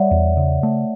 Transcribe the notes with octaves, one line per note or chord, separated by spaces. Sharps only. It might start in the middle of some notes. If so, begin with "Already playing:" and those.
Already playing: G3 C#5 D5 E5 F#5
E2
C#3
A3